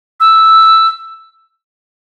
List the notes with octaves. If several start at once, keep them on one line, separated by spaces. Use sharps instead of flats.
E6